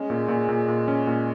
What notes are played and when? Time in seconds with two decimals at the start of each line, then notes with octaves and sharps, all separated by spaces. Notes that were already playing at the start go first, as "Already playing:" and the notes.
Already playing: G#3 C#4
0.10 A#2
0.28 A#2
0.49 A#2
0.68 A#2
0.88 C#4
1.07 A#2